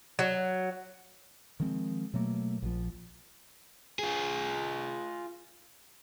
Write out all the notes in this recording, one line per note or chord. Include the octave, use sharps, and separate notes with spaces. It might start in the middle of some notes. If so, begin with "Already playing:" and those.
F#3
D#3 F3 G#3 C4
B2 F#3 A3 A#3
A#1 F3
F4 G#4